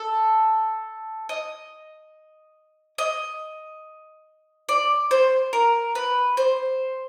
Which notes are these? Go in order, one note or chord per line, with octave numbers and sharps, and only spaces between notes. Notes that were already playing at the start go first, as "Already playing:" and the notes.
Already playing: A4
D#5
D#5
D5
C5
A#4
B4
C5